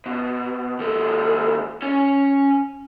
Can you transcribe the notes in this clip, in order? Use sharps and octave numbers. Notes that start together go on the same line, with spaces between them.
B2
D#2 A4
C#4 C#5